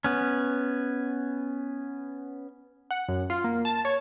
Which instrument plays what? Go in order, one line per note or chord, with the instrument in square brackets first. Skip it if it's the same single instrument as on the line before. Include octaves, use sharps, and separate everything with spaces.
[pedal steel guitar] B3 C#4
[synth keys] F#5
F#2
F4
A#3
A5
C#5